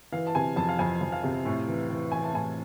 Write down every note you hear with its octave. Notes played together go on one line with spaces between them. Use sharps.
E3 F5
A5
C3 G#5
F2 A5
F5
F2 G#5
F2
F5
C3
A2
E3
E3
E3 G#5
A5
A2 G#5